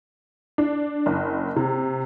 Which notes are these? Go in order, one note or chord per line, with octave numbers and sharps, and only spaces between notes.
D4
F#1
C3